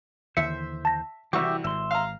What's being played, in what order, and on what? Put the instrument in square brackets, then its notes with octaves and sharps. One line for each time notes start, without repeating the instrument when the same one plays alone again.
[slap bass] D#2 D3 E3 [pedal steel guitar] C5 [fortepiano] E5 [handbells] C#7
[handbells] A5 A#6
[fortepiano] C2 F#4 C#6 [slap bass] E3 [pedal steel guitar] G4 E5
[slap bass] G#1 [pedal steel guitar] E5 C6
[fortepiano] F5 A#5